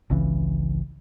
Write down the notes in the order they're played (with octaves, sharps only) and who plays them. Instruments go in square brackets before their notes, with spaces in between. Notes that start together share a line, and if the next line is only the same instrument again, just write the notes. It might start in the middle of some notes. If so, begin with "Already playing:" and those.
[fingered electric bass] G#1 C#2 C#3 E3